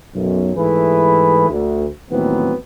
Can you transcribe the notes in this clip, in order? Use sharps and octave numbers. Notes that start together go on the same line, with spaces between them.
B1 F#2
G#2 E3 A3 E4 G#4 B4
D2
D#2 A2 E3 F#3 B3 C4